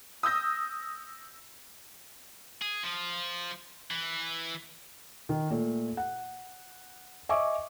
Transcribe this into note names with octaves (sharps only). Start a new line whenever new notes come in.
D#6 E6 G6 A#6
G#4
F3
E3
D#3
A#2 A3
F#5
D#5 E5 G#5 C#6 D6